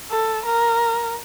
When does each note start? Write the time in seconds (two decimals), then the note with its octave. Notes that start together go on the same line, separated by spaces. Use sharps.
0.11 A4
0.46 A#4